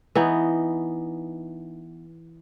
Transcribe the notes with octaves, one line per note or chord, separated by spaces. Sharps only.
E3 B3 D#4